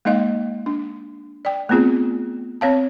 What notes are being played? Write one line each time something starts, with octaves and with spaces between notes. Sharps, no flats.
G#3 A#3 D#4 D#5 F5
D4
D5 G5
A3 B3 C4 F4 G#4
C4 C#5 F5 A5